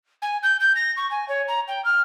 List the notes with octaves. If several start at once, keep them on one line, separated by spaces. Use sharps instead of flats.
G#5
G6
G6
A#6
C#6
G#5
C#5
A#5
G5
F6